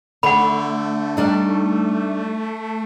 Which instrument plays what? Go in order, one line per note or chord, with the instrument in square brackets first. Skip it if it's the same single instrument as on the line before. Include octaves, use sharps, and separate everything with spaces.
[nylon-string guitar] D3 [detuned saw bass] A3 [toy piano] F#5 B5
[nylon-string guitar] G3 D4 D#4